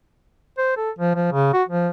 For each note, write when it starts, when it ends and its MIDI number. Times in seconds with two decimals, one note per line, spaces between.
0.58 0.75 72
0.77 0.90 69
0.98 1.14 53
1.16 1.31 53
1.32 1.52 49
1.53 1.63 66
1.69 1.90 53